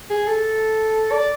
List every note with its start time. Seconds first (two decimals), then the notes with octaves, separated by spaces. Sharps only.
0.10 G#4
0.27 A4
1.12 D5